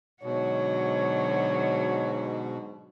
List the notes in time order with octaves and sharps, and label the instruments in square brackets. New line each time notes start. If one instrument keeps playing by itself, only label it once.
[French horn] G#2 [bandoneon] B2 [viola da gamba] D3 F#3 F#4 [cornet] C#5